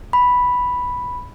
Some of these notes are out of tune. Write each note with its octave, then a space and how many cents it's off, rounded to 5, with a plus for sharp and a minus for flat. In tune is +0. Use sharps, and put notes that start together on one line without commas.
B5 +0